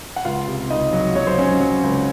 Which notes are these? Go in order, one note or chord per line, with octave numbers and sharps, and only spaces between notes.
F#5
C#2 F4 F5
C3
C#2 D#4 D#5
F#3
F#3 C#5
C5
F#3 C#4 C#5
F#3
C#2